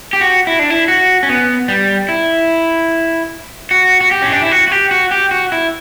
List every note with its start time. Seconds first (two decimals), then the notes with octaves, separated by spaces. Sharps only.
0.13 G4
0.20 F#4
0.47 E4
0.59 D4
0.70 E4
0.88 F#4
1.23 C#4
1.29 B3
1.68 G3
2.09 E4
3.71 F#4
4.01 F#4
4.11 G4
4.23 C#4
4.32 D4
4.41 E4
4.52 F#4
4.68 F#4
4.72 G4
4.91 F#4
5.11 G4
5.31 F#4
5.52 E4